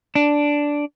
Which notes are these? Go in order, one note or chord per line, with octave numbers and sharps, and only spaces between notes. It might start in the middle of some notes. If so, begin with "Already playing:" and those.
D4